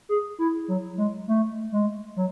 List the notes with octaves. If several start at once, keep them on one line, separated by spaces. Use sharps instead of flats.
G#4
E4
F#3
G#3
A3
G#3
F#3